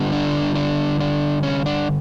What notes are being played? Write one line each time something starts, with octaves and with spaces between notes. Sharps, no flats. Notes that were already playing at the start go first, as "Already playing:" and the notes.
Already playing: D3 G3 B3
D4
D4
D4
C#4
D4